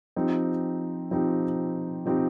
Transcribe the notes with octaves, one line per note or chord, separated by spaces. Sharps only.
F3 C4 D#4 G4
F3 C4 D#4 G4
F3 C4 D#4 G4